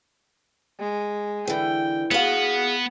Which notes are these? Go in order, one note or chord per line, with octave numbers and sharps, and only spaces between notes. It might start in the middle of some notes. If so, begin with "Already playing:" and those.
G#3
D3 E3 G5
B3 F#4 G#4 F5